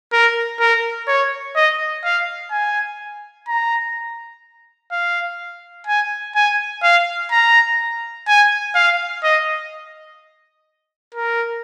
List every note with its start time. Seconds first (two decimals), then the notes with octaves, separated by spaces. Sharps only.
0.13 A#4
0.60 A#4
1.08 C#5
1.56 D#5
2.04 F5
2.51 G#5
3.48 A#5
4.92 F5
5.87 G#5
6.35 G#5
6.83 F5
7.31 A#5
8.28 G#5
8.75 F5
9.23 D#5
11.15 A#4